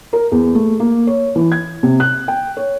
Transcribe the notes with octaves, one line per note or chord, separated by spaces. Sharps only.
A#4
E2
A3
A#3
C#5
E3
G#6
C3
F#6
G5
C#5